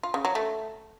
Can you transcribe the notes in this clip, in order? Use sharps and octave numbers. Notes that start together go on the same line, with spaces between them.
F4
C#3
F#3
A3